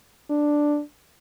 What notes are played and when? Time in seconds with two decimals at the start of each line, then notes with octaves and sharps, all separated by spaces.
0.30 D4